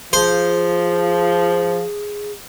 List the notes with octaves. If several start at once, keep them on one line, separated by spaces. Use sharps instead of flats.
F3 G#4 C5